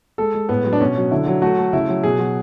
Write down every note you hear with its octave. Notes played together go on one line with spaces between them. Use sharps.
G#3 A4
G#3
A2 B3
F#3
D4
B2 C#4
F#3
D3 E4
F#3
A3 F#4
A3
C#3 E4
F#3
B2 G#4
F#3